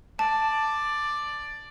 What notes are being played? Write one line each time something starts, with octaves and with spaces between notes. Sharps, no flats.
D5 A5